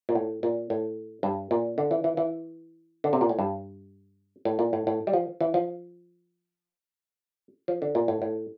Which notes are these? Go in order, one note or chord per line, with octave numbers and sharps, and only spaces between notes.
A#2
A2
A#2
A2
G2
A#2
D3
E3
E3
E3
D3
C3
A#2
A2
G2
A2
A#2
A2
A2
G3
F3
E3
F3
F3
D3
A#2
A2
A2